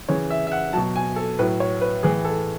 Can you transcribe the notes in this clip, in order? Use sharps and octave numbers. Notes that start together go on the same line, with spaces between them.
C#3 E3 C#5
E5
E5
F#5
B2 F#3 A5
G#5
A4
A2 F#3 B4
C#5
B4
A2 E3 G#4
A4